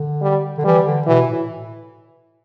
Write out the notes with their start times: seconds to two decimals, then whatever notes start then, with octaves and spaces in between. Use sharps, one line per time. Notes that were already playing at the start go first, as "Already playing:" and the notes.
Already playing: D3
0.22 G3
0.58 D3
0.65 E3 G3
0.86 D3
1.07 B2 E3
1.28 A2